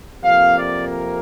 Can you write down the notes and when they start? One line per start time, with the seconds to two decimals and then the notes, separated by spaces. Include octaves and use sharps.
0.22 F2 C3 A#3 F5
0.55 D5
0.87 A#4